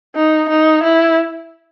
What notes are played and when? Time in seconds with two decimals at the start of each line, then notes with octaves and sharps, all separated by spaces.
0.15 D#4
0.49 D#4
0.83 E4